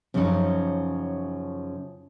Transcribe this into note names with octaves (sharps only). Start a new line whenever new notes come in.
F#2 C#3 F3 B3 C#4 D#4